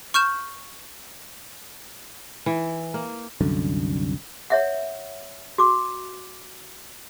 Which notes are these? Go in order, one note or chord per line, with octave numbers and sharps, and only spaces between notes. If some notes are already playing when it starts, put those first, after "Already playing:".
C#6 F6 G6 E7
E3
A#3
C2 F#2 D3
C#5 E5 F#5
F#4 D6